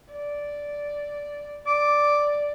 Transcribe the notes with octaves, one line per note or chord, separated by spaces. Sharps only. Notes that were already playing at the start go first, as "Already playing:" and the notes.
D5
D5 D6